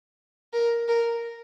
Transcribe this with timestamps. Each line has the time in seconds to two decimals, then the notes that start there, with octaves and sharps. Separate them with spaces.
0.53 A#4
0.88 A#4